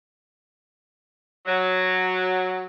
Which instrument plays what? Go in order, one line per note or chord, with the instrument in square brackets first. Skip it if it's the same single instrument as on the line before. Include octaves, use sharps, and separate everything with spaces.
[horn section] F#3